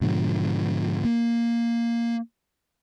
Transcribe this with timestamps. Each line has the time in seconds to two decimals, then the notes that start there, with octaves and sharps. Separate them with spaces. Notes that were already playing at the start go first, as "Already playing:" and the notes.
0.01 G#2 B2 D3 F3
1.05 A#3